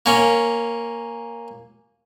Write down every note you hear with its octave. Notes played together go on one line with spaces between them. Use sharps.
A#3 C#4